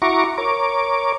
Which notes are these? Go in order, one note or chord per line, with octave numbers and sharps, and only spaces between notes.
E4 F#4 A#5 C#6 D6
A#4 C#5 D6